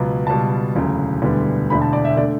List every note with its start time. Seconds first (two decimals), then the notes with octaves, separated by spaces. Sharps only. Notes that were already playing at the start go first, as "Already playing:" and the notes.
Already playing: C#2 B2 F#3 B3
0.27 C#2 B2 G3 A5
0.75 E1 D2 C#3 F#3
1.22 E1 D2 D3 G3 B3
1.70 E1 D2 D3 B5
1.82 A5
1.93 D5
2.05 E5
2.17 D3 A3 D5